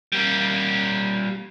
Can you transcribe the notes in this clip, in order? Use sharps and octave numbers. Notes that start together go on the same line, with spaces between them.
G3 A#3